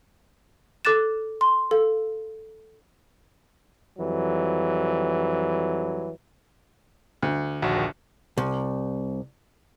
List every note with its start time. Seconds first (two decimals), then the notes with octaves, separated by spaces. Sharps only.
0.85 A4 D6 F#6 A6 E7
1.41 C6
1.71 A4 F5
3.98 F2 E3 F#3 G3
7.22 D2
7.62 A#1 D#2 F#4
8.37 C2